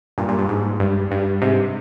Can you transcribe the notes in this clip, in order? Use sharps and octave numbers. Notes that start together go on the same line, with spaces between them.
G2 A#2
G2 A#2
G2
G#2
G2
G2
G#2 C3